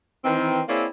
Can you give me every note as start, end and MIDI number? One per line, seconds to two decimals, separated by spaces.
0.25 0.61 51
0.25 0.61 52
0.25 0.61 60
0.69 0.86 58
0.69 0.86 60
0.69 0.86 64
0.69 0.86 68
0.69 0.86 73
0.69 0.86 74